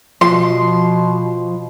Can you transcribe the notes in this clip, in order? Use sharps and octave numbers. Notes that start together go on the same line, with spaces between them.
B2 F3 C6